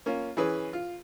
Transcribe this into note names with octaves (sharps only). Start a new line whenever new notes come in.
A#3 C#4 F4
E3 C#4 G#4 B4
F4